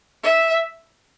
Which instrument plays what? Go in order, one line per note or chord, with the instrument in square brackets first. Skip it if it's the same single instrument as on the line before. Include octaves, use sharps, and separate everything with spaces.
[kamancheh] E5